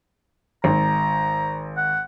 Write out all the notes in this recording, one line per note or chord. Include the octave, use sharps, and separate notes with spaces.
G#1 A#5
F#5